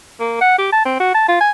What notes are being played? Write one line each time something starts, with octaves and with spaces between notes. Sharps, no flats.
A#3
F#5
G4
A5
C4
F#4
A5
F4
G#5